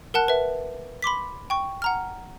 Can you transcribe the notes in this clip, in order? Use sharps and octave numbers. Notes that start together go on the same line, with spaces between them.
A#4 F#5 A5 F#6
B4 E5
B5 C6 D6 B6
G5 C#6
F#5 A#5 F6